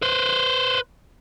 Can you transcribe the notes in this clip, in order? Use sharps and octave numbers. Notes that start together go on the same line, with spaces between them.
B4 C5